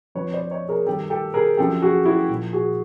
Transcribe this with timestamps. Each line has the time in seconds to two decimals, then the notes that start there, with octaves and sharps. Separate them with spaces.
0.15 F2 D3 F3 B4 C#5
0.33 C5 D5
0.51 C#5 D#5
0.68 G#4 A#4
0.86 G2 D#3 G4 A4
1.10 G4 A4
1.34 G#4 A#4
1.58 F#2 D3 F3 G4 A4
1.82 F#4 G#4
2.05 E4 F#4
2.29 A#2 F3
2.53 F#4 G#4